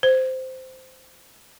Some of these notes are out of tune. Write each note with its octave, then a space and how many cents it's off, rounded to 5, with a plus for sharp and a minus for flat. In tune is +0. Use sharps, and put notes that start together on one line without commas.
C5 -10